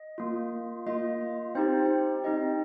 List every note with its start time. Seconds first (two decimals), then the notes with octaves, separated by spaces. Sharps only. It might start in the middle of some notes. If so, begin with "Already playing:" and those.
Already playing: D#5
0.18 A#3 F4
0.87 A#3 F4 D#5
1.55 C4 D#4 G4 C5
2.24 C4 D#4 G4 D#5